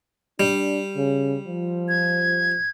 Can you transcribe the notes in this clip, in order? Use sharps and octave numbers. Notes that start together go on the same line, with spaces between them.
G3 D4
C#3
F3
G#6